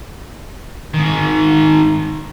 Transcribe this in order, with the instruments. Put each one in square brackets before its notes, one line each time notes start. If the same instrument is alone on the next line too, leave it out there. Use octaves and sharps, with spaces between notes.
[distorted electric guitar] G#2 D#3